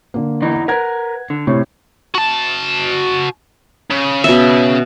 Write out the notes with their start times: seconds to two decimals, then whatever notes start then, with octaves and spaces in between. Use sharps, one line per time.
0.14 D3 A#3
0.42 E2 E3 D#4
0.68 A#4 B4 F#5 G#6
1.30 D3
1.47 A2 C3 C#5
2.15 F#4 A5
3.91 C#3
4.24 B2 E5